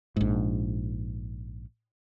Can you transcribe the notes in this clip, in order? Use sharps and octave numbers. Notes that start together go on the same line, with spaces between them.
A#1 G#2